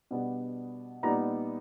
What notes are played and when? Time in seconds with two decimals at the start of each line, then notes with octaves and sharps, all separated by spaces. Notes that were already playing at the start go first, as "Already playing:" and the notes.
0.11 B2 G3 B3 D4
1.03 A#2 G3 B3 D#4 A#5